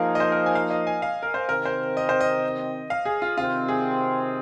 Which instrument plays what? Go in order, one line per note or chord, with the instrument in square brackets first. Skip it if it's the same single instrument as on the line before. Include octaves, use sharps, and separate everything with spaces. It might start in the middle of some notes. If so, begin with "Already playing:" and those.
Already playing: [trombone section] F3 A#3 D#4 [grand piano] G#4 A#4 F5
[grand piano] D#5
C5
A#4
G#5
F5
D#5
G#5
F5
A#4
C5
[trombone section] C3 D#3 C4 [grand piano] A#4
[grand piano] C5
D#5
C5
D#5
F5
G#4
F4
[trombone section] C3 D#3 C4 [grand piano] F4
[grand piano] G#4